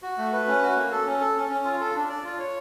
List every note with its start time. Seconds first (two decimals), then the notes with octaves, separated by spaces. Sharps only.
0.02 F#4
0.18 A3
0.33 B4
0.48 C#4
0.62 F#4
0.76 A#3
0.92 A4
1.06 C#4
1.21 A4
1.36 C#4
1.50 C#4
1.65 F4
1.81 A4
1.95 D4
2.09 D5
2.24 F4
2.39 C#5